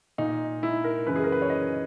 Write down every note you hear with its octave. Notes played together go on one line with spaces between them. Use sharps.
A#2 D#4
E4
A#4
F#2 C#3 E3 B4
G#4
A#4
B4
C#5
D#5